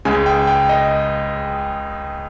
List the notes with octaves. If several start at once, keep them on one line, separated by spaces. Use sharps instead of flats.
C#2 C#3 G#3 G#5
G5
G5
D#5